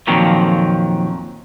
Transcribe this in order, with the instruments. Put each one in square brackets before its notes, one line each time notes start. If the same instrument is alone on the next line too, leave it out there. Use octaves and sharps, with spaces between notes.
[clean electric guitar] F2 A#2 D#3 F3 F#3